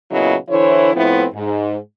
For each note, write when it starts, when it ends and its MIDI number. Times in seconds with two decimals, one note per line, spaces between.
0.12 0.35 46
0.12 0.35 49
0.12 0.35 54
0.12 0.35 59
0.12 0.35 64
0.12 0.35 75
0.49 0.93 50
0.49 0.93 52
0.49 0.93 64
0.49 0.93 72
0.49 0.93 73
0.94 1.25 45
0.94 1.25 53
0.94 1.25 59
0.94 1.25 60
0.94 1.25 64
1.34 1.76 44